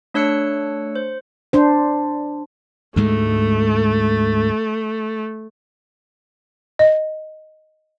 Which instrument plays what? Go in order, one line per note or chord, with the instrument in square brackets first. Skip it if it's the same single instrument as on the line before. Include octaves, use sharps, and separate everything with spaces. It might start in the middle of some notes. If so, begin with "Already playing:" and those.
[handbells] A3 D4 C#5 E6 F#6 C#7
C5
[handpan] D4 C5
[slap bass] D2 G#2 G#3 [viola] A3
[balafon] D#5